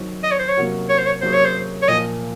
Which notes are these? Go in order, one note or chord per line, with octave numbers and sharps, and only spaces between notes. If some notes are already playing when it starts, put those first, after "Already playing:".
Already playing: D#3 F#3 C4
D#5
C#5
C5
C#5
C3 F#3 A#3 C#4 F#4
C#5
C5
C#5
C3 F#3 A#3 C#4 G#4 C5
C#5
C5
C#5
A#2 F3 A#3 D#5